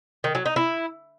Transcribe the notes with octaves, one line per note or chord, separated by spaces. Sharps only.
D#3
F#3
D#4
E4